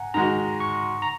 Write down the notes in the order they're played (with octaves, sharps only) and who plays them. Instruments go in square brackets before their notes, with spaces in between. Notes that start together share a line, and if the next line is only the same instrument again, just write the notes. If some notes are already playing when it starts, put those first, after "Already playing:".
Already playing: [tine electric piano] F#5 G#5 A#5
[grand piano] D#3 G#3 F#4 [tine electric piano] A#5
[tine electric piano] C#6
A#5